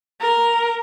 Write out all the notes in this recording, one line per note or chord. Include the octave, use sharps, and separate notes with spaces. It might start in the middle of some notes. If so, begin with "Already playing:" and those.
A#4